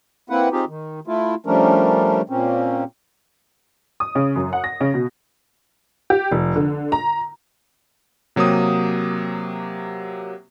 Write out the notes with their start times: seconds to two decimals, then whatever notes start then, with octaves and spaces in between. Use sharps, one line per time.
0.30 A#3 C4 E4 B4 F#5
0.52 C4 D#4 F4 G4 G#4
0.68 D#3
1.07 A3 E4 F4
1.46 F3 G3 A3 C#4 D4 A#4
2.30 A#2 A#3 C4 C#4
4.00 D#6
4.15 C#3
4.36 F#2
4.53 F#5
4.64 A#6
4.81 C#3
4.94 B2
6.10 G4
6.32 F1
6.56 D3
6.92 A#5
8.36 C3 F#3 A#3 G4 D#6